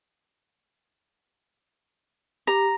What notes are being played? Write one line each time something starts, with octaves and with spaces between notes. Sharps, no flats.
G4 A#5